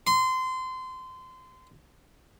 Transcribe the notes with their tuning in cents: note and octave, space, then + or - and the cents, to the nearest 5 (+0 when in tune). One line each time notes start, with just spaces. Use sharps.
C6 -25